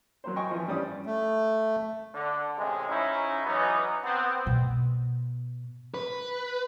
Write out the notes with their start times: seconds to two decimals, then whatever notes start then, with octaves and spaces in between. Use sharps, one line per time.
0.24 F#3 A#3 C5
0.36 D#5 G5 G#5 C#6
0.51 E3 F3
0.68 G2 G3 C#4 D5 D#6
1.06 A3
2.14 D3
2.58 A1 C3 G#3
2.90 G#2 C#4 D#4 E4
3.46 E3 F#3 B3 C#4 D#4
4.04 B3 C4
4.47 B2
5.94 B4